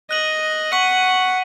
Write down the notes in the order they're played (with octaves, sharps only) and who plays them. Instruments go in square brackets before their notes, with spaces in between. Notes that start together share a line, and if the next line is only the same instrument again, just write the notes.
[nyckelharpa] D#5 [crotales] F#6 D#7 F#7
[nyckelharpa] F#5 [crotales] C#6 B6 F#7